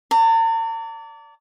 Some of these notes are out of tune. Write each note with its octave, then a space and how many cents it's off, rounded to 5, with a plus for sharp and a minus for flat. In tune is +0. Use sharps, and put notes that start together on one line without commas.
D5 -30 A#5 -45